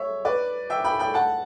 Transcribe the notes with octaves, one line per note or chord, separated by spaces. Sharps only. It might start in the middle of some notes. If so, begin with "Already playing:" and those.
Already playing: C#5 E5
B4 D5
E5 G5
G5 B5
G5 B5
F#5 A5